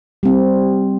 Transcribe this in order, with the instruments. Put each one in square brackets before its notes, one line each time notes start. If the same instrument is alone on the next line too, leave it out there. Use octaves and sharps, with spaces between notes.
[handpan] G3 C4